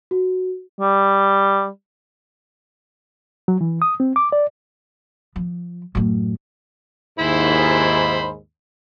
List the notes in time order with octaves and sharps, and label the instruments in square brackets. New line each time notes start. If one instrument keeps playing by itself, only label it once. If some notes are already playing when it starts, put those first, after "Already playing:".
[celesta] F#4
[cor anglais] G3
[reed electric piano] F#3
E3
D#6
C4
D6
D5
[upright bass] F3
F#2 A2
[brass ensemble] D#2 G#2 [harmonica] E4 C5 B5